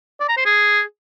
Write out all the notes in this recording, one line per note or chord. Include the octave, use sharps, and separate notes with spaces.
D5
A#5
C5
G#4